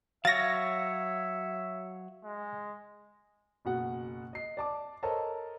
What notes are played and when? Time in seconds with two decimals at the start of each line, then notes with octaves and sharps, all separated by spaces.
0.25 F#3 C#5 E5 F5 A6 A#6
2.24 G#3
3.65 F#1 B2 F#5
4.33 D#5 C7
4.57 D5 A5 D6
5.03 A4 A#4 C5 C#5 D#5 A5